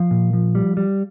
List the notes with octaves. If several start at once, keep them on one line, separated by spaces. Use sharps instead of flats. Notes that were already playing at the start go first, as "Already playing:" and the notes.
Already playing: F3 F5
A#2
F3
G3
G3